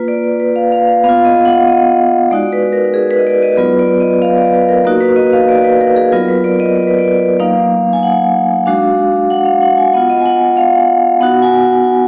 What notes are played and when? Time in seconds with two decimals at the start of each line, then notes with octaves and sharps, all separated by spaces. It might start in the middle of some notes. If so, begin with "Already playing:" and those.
Already playing: A#3 F4 B4
0.08 D5
0.40 B4
0.56 F5
0.72 F5
0.87 F5
1.04 B3 F5
1.09 F4
1.25 D#5
1.45 F#5
1.68 D#5
2.31 G#3 D#4 F#4 D5
2.53 B4
2.72 A#4
2.94 G#4
3.11 B4
3.19 D#5
3.27 D5
3.43 D#5
3.57 F#3 B3 F4 B4
3.79 D5
4.00 D#5
4.22 F5
4.38 D5
4.54 B4
4.69 A#4
4.85 A#3 D#4 F#4 A#4
5.01 B4
5.16 D#5
5.33 F5
5.49 D5
5.64 B4
5.81 A#4
5.96 G#4
6.12 F#3 B3 F4 A#4
6.28 B4
6.44 D5
6.60 D#5
6.76 D5
6.87 B4
6.99 D5
7.40 F#3 A#3 D#4 F5
7.93 G#5
8.03 F#5
8.66 G#3 D4 F#4 F5
9.30 F#5
9.45 F5
9.62 F#5
9.77 G#5
9.93 B3 F4 F#5
10.10 D#5
10.20 G#5
10.26 F#5
10.41 F#5
10.57 F5
11.20 B3 D#4 F#4 F#5
11.42 G#5
11.84 G#5